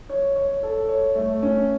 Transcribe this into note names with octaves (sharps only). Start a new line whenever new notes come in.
C#5
C#5
A4
C#5
A3
C#4